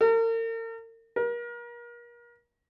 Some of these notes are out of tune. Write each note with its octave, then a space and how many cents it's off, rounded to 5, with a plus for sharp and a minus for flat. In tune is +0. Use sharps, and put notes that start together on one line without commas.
A#4 -40
A#4 +35